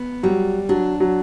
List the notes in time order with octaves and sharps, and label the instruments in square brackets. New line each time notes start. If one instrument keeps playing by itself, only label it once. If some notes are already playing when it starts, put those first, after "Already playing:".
Already playing: [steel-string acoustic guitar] B3
[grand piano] F#3 [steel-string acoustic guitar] G3
[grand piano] F#3 [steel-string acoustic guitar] D4
[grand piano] F#3